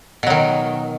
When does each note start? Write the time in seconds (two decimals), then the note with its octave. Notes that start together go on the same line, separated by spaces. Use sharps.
0.23 B2
0.27 F#3
0.30 D#3